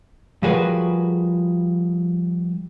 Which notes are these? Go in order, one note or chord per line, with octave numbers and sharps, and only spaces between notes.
F3 G3 F#4 G#4 A#4 B4